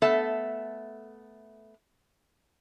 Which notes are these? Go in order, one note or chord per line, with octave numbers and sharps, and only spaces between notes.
A3 B3 A4 E5